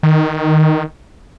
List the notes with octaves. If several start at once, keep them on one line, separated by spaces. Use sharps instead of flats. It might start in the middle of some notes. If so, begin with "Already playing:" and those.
D#3